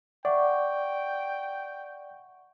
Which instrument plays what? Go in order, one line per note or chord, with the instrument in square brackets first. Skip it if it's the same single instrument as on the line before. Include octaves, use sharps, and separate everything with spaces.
[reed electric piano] D5 [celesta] E5 F#5 C#6 [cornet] G5